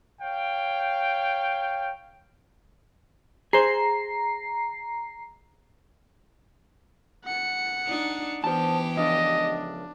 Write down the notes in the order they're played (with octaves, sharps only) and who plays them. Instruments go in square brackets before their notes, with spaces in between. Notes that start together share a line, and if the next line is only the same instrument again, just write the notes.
[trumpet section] C#5 F5 G5
[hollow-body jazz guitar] G#4 C5 [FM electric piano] A#5 C7
[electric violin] F#5 C#7
[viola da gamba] D4 D#4
[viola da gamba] E3 B3 G4 [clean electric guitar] C5 A5
[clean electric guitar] C#3 F3 [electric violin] D4 [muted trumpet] D#5